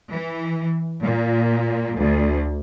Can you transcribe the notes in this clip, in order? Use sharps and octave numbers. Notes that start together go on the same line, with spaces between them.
E3
A#2
D2